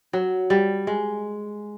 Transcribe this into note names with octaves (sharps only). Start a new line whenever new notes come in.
F#3
G3
G#3